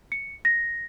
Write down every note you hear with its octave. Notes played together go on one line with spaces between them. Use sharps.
C#7
A#6